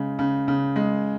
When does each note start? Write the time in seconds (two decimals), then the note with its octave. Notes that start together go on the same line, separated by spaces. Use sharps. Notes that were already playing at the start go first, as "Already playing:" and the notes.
Already playing: C#3 G#3
0.19 C#3
0.48 C#3
0.76 G#3